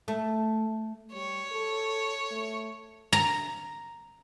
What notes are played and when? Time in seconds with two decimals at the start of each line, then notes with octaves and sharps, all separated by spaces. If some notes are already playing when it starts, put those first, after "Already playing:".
0.08 A3
1.13 G3 C#5
1.52 A4
2.31 A3
3.13 A#5